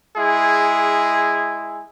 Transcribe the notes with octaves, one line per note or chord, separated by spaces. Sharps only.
G#3 E4 G#4